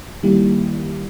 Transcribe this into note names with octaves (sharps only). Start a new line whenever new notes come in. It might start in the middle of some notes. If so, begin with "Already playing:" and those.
D#3 G3 A#3 E4 G4